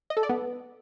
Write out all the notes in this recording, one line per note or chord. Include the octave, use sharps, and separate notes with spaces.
D#5
A4
D5
B3